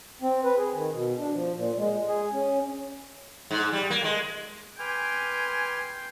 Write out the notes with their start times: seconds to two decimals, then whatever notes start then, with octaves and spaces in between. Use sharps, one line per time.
0.22 C4
0.44 B4
0.57 G#4
0.74 D#3
0.93 B2
1.19 D4
1.33 F3
1.56 A#2
1.78 G#3
2.08 G#4
2.33 C#4
3.51 G#2
3.72 G3
3.90 A#3
4.04 G#3
4.79 B4 G5 G#5 C6 D6 F6